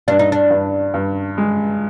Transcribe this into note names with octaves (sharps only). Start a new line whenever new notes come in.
G2 D4
D#4
D4
G2
G2
G#3